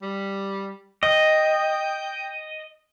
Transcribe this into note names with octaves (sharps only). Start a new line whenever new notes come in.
G3
D#5 G5